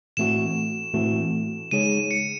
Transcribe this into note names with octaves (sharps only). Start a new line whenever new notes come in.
A2 E3 A3 C4 F#4 E7
A2 E3 A3 C4 F#4
C#3 G#3 D#4 G#4 C#5 D#7
C#7